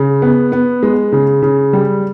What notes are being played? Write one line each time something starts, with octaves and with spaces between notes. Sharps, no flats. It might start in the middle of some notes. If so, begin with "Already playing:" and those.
Already playing: C#3
B3
B3
G#3
C#3
C#3
G3